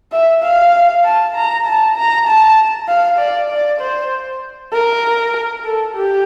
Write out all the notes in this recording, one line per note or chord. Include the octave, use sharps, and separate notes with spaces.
E5
F5
A5
A#5
A5
A#5
A5
F5
D5
D5
C5
A#4
A4
G4